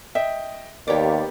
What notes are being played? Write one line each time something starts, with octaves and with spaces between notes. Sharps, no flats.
D#5 E5 G5
D#2 A#3 B3 G4 C#5 D5